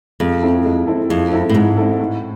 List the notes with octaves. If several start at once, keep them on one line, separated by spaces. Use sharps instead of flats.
F2 G#3
C4 E4 A4
G#3
C4 E4 A4
F2 G#3
C4 E4 A4
A2
G#2 G#3
C4 E4 A4
A2